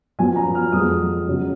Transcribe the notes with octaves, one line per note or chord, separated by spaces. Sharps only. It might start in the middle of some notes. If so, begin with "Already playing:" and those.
F#2 F3 B3 G#5
A#5
F6
F2 F3 G#3 B3 D#6
F#2 C#3 F#3 B3